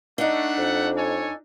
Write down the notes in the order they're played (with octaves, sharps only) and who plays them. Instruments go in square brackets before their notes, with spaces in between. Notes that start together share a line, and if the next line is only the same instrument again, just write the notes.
[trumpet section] A3 F#5 [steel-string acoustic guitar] D4 D#4
[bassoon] F2
[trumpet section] A4 C#5 G#5